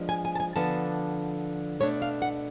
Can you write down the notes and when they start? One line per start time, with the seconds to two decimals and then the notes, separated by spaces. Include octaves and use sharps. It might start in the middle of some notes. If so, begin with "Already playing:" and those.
Already playing: F3 G#3 B3 D4
0.09 G#5
0.25 G#5
0.35 A5
0.40 G#5
0.56 D3 F3 B3 D4 A5
1.80 B2 A3 D4 C#5
2.02 F5
2.22 F#5